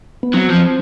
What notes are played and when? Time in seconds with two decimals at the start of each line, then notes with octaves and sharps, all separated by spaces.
0.23 B3
0.34 F#3 C4
0.50 F3